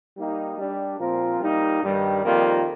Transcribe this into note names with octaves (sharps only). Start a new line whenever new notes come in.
G3 A#3 D#4 G4
G3 D4 G4
A#2 F3 C4 F4 A#4
G3 A#3 D#4
G2 D#3 G3
F2 D#3 G3 A#3 F4